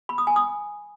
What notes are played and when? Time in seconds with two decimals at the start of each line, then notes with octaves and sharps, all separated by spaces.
0.09 B5
0.18 D#6
0.27 G#5
0.36 D#6